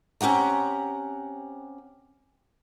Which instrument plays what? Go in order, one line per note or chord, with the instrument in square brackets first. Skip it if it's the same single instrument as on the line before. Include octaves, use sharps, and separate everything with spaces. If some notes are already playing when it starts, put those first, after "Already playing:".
[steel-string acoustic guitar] C4 C#4 G4 F#5 A#5